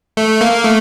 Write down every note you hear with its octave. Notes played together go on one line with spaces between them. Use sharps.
A3
A#3
A3